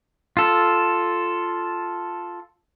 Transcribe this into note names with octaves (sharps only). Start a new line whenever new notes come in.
F4 A4